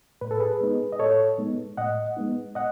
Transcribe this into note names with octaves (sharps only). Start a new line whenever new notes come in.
A2 B4
A4
G#4 B4
G#3 B3 D#4
D#5
A2 A4 C#5
G#3 B3 D#4
A2 D#5 F#5
G#3 B3 D#4
D#5 F#5